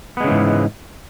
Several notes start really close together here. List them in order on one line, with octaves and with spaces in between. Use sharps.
B3 G#3 C#3 E3 G#2